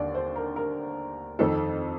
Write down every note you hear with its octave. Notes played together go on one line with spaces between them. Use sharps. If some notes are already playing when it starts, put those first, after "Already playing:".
Already playing: D#2 D3 D5
C5
A#4
A#4
F2 D#3 A4